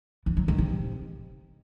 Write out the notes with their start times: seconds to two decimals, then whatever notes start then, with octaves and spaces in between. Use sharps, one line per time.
0.26 E3
0.37 F#3
0.48 D#3
0.58 C3